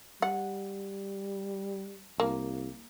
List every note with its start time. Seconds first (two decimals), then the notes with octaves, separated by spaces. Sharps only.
0.22 G3 F#5
2.20 C2 A#3